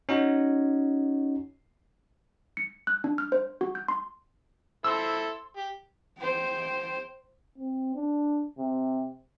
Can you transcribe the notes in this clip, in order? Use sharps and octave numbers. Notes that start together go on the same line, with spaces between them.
C#4 D#4 F#4
C#7
F#6
D4
F6
C5
F#4
G6
C6
E4 A4 C5 C6 E6
G4
C5 G5
C4
D4
C3